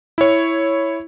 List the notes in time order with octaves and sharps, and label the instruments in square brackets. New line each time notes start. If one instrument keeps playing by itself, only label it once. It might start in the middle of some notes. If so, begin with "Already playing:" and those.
[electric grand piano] E4 C#5